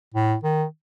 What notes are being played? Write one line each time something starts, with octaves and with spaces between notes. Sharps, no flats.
A2
D#3